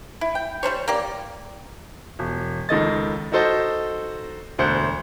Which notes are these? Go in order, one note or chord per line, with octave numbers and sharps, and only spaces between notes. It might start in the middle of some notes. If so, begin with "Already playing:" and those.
E4
G5
G3 D4 C5 C#5
A#3 G4 D5
E1
C#2 D#3 A4 D#5 A6
D#4 F#4 A4 C5 D#5
E1 D2 C5 F#6 C#7